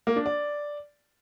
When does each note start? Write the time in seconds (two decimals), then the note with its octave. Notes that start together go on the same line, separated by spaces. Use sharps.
0.07 A#3
0.16 D4
0.26 D5